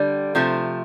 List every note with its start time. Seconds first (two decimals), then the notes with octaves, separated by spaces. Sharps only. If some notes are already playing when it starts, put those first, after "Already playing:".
Already playing: D3 G3
0.35 C3 F3 A3